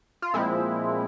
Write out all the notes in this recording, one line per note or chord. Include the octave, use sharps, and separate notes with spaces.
F4
A#2 F3 G#3 C4 E4